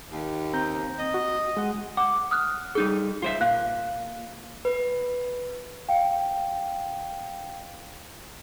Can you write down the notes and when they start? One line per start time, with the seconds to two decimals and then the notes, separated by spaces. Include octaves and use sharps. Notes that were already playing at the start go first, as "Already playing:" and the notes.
0.12 D#2
0.53 C4 A#5 G6
0.98 D#5
1.14 F#4
1.57 G#3 F#5
1.97 F#5 D6
2.31 D#6 F6 F#6
2.75 G3 D#4 G#4 A4
3.22 F4 C5 E5
3.41 A#2 F5 F#6
4.65 B4
5.89 F5 G5